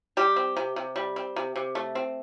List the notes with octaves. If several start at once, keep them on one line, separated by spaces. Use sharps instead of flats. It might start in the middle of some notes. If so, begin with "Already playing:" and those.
G3 G4
C4
C3
C3
G3
C4
C3
C3
A3
C4